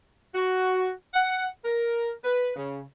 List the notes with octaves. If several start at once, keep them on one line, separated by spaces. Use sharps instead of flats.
F#4
F#5
A#4
B4
C#3